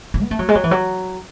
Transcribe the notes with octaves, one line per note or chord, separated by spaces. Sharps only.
E3
B3
A3
F#3
G#3
F#3
E3
F#3